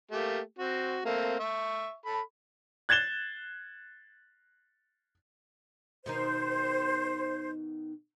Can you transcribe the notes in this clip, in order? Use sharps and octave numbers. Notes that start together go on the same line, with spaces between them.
A3 A#3 G4
C4 F#4
A3 A#3 C4
E5 C#6
A4 B5
F#6 G#6 A6 E7 G7
B2 D#3 D#4 C5